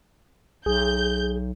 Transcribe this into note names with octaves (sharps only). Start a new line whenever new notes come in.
B1 G#4 G6